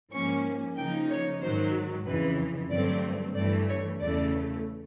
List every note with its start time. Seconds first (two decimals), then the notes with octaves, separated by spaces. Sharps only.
0.12 G#2 F3 A#3 C#4 C#6
0.77 C#3 F3 A#3 D#4 G5
1.10 C#5
1.42 G#2 D#3 F#3 C5
2.06 F2 C#3 E3 B4
2.71 G2 D3 F#3 A3 C4 D5
3.36 G2 E3 A3 D5
3.68 C#5
4.00 E2 C#3 E3 A3 D5